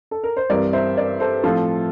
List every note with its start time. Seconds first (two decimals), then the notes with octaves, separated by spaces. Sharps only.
0.11 A4
0.24 A#4
0.37 C5
0.50 G2 E3 G3 C4 A#4 D5
0.73 C5 E5
0.96 A#4 D5
1.20 A4 C5
1.43 A2 F3 C4 F4 A4